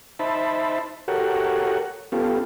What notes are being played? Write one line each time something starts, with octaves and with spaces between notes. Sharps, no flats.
D#4 C5 E5 A5 B5
F#4 G4 A4 A#4 C#5 F#5
B3 C#4 F4 G4 A4